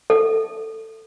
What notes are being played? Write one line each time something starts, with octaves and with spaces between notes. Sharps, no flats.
A4